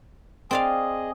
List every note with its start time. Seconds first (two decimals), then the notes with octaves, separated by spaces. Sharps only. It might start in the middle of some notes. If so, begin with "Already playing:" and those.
0.51 C4 G#4 D5 D#5 F5